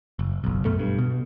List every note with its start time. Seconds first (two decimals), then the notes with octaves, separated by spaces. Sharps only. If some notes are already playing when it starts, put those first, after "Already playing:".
0.19 F#1
0.44 F#1 B1
0.65 F#2 B2 A3
0.79 G2
0.98 B2